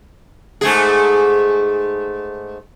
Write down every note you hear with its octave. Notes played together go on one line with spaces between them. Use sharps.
G#2 A3 G#4